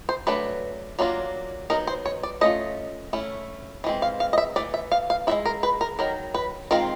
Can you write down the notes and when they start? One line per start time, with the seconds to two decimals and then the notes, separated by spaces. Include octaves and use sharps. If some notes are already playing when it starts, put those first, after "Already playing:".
0.09 C5
0.27 F#3 A3 D4 B4
0.99 F#3 A#3 D4 F4
1.70 F#3 B3 D#4 A#4
1.87 C5
2.06 C#5
2.23 D5
2.41 A3 C#4 F4 D#5
3.13 A3 C#4 E4
3.84 E3 G#3 C4
4.02 F5
4.20 F5
4.33 D#5
4.38 E5
4.56 E3 A3 D5
4.74 E5
4.92 F5
5.10 F5
5.27 G#3 C4 E4 E5
5.46 A#4
5.63 B4
5.81 A#4
5.99 D#3 F#3 A#4
6.34 B4
6.71 D#3 G#3 C4 F4 A#4